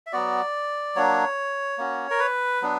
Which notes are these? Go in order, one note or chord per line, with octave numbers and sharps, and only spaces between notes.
E5
F#3 B3 F#4 D5
F#3 A#3 D4 C#5
A#3 C#4 F#4
A#4
B4
F#3 B3 D4